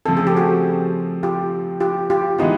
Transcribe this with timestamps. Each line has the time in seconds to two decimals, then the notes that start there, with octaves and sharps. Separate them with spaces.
0.06 C#3 F3 A3 C4 A4
0.17 G#4
0.27 G4
0.37 F#4 G#4
1.23 F4 G4
1.80 F4 G4
2.10 F4 G4
2.39 E3 G#3 B3 D#4 F4